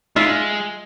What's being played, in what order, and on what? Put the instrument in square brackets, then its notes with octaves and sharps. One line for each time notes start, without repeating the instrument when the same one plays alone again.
[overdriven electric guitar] G#3 [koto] F4 E5